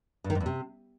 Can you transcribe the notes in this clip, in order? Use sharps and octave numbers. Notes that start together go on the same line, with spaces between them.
G2
D#3
G#2
E2
C3